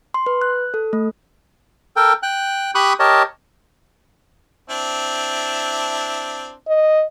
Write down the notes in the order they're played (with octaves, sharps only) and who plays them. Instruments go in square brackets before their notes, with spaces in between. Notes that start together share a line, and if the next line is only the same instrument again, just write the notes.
[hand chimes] C6
B4
F#6
A4
A3
[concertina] A4 A#4 G5
G5 F#6
G4 B5 C#6 D#6 F#6
G4 A#4 C#5 D#5 A5
[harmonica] C4 D4 E4
[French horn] D#5